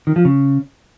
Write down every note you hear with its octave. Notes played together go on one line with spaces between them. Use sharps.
D#3
F3
C#3